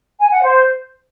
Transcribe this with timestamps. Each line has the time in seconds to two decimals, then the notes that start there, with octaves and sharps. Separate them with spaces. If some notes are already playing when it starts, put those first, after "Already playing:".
0.20 G#5
0.31 F#5
0.43 C5